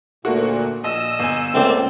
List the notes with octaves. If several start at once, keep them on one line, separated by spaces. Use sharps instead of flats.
D2 A#2 A3 A#3 F#4
A#1 D#5 E6
G1 G#5
C#2 A3 A#3 C4 D5